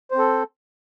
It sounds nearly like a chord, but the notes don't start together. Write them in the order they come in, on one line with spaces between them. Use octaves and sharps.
C5 C4 A4